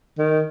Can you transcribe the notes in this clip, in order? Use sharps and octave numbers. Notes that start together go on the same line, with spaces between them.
D#3